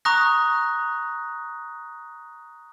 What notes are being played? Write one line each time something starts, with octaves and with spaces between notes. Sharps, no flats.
A#5 C#6 D#6 F#6 A#6